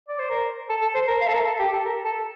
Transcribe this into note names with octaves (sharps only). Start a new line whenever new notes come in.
D5
C5
A#4
A4
A4
C5
A#4
F5
A4
A#4
A4
G4
A4
A#4
A4